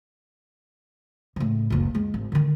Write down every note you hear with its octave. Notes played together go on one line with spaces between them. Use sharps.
A2 C#3
F#1 C#2
G#3
G#1
D3 D#3